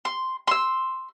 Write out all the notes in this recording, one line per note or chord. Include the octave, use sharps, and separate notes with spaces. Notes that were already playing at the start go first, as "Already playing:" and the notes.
C6
C6 E6